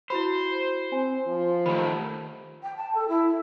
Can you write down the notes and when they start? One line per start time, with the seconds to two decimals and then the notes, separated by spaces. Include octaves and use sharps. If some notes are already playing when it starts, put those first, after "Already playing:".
0.10 E4 F#4 C5 B5
0.92 C4 G#5
1.27 F3
1.66 D#3 A3 G4 B5
2.63 G5
2.77 A5
2.95 A4
3.09 E4